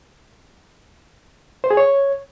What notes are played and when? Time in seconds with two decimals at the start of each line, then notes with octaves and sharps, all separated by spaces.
1.64 C5
1.71 G#4
1.77 C#5